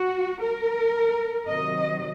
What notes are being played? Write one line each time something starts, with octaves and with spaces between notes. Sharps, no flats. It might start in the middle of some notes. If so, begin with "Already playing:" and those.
Already playing: F#4
A#4
C3 D#3 F#3 D#5